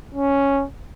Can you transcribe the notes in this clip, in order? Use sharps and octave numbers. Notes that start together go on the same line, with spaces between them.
C#4